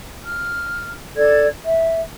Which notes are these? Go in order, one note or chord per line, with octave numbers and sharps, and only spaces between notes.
F6
D4 A4 D5 G#6
E5